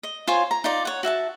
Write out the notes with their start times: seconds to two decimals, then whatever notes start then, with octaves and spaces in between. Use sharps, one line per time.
0.03 D#5
0.28 F4 C5 C#5 G#5
0.51 A#5
0.64 D#4 F4 D5
0.85 C#5 F#5
1.03 F#4 E5 F5 A5